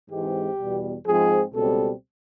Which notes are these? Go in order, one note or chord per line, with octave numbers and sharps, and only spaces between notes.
G#2 E3 G#3 C4 G4
E2 B2 G3
G#2 F3 G#3 C4 G#4
C#2 B2 G3 C4 A4